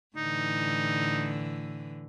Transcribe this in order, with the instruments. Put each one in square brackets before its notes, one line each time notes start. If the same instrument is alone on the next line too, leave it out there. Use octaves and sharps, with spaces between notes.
[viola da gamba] A2 D3 E3 [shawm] D#4